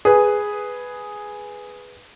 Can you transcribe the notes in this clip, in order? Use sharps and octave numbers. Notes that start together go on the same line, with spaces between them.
G#4 B4